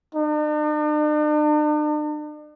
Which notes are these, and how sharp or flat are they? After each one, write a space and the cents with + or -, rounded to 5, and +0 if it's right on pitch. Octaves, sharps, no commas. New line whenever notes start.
D4 +45